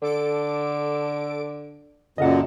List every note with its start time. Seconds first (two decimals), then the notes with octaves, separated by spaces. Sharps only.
0.02 D3 A4 D6 D7
2.18 F#2 A#2 C#3 A4 D#5 F5 F#5 A5